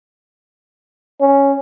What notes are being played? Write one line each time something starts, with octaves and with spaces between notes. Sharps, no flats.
C#4